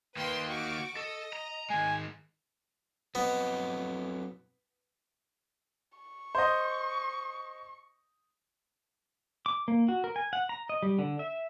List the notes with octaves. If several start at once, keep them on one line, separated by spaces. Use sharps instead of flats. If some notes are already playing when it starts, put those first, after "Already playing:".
D#3 A#3 B4 G5 C6
F#4 C#6 D6
A4 D#5
A#5
D#3 G#3 G#5
F#3 B3 C4 D#5
C#6
C5 D#5
D6
A#3
F#4
A#4
G#5
F#5
A#5
D#5
G3
D3
E5